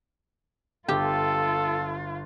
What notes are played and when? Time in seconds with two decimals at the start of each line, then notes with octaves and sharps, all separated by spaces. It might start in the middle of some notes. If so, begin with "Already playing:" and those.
0.88 G1 F4 G4 A4